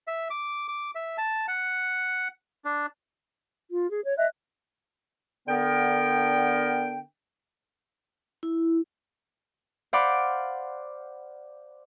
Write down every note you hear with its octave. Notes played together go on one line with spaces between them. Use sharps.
E5
D6
D6
E5
A5
F#5
D4
F4
G#4
C#5
D#5 E5 F#6
D3 B3 A#4 G5
E4
C5 D5 F5 F#5 B5 D6